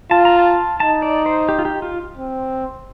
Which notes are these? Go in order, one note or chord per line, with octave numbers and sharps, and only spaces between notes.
F4 A5
A#5
A5
D#4 A5
D5
C5
G4
F4
G4
F4
C4